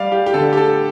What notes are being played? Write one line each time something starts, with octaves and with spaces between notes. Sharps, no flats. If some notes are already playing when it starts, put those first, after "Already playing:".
Already playing: G3 D5 F5
G4
G4
D3 A4
G4
A4